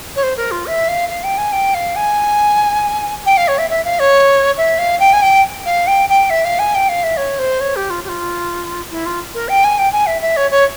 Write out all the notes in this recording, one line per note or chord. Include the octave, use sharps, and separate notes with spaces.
C#5
C5
A#4
F4
E5
F5
F5
G5
G#5
G5
F5
G#5
G5
F5
C#5
E5
E5
F5
C#5
E5
F5
G5
G#5
G5
F5
G5
G5
E5
F5
G#5
G5
F5
E5
C#5
C5
C#5
G4
F4
G4
F4
E4
F4
A#4
G5
G#5
G5
G#5
E5
E5
C#5
C#5